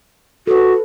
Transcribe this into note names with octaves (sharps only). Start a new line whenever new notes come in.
F#4 A4 B4